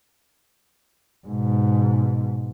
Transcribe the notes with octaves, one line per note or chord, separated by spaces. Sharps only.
G#2 B2